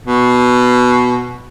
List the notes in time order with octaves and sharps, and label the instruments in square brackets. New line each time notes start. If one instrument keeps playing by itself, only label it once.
[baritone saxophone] B2